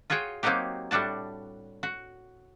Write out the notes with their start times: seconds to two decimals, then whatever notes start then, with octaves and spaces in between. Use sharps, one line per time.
0.10 F4 F#4 G#4 C#5 G5
0.43 F#3 A#3 C4 D#4 F#4 G4
0.91 A2 G3 D4 F#4 A5
1.83 F#4